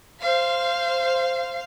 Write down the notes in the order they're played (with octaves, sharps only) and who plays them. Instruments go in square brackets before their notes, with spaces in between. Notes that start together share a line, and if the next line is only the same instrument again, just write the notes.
[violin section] C5 F5